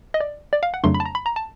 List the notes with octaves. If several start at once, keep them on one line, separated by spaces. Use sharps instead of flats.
D#5
D5
D5
F5
F#5
F2 C#3 F#3 A3 D4 C6
B5
A5
A#5
B5
A#5
A5